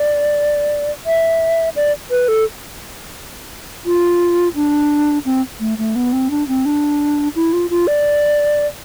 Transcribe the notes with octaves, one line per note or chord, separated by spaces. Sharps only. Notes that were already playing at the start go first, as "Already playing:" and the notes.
Already playing: D5
E5
D5
B4
A4
F4
D4
C4
A3
A3
B3
C4
D4
C4
D4
E4
F4
F4
D5